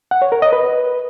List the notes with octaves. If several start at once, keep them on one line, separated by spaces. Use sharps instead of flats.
F#5
C#5
A#4
D#5
B4